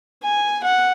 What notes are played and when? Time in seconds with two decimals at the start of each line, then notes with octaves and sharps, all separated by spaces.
0.23 G#5
0.64 F#5